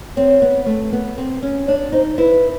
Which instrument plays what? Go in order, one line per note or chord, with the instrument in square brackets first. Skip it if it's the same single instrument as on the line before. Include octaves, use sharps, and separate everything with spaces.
[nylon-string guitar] C4 [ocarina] C#5
[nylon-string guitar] B3
A3
B3
C4
C#4
[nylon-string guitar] D4 [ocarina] C#5
[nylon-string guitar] D#4 [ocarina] C5
[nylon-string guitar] E4 [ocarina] B4